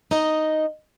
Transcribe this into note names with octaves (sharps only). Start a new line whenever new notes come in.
D#4 D#5